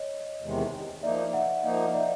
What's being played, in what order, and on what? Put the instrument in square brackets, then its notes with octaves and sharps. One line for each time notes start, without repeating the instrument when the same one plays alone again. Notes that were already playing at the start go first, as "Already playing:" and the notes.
Already playing: [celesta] C#5 D#5
[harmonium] E2 C3 D#3 G#3
[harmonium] F3 A#3 D#4 [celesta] D5 E5
[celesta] E5 F#5
[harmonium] F3 A#3 D#4 [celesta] D#5 F5
[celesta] D5 E5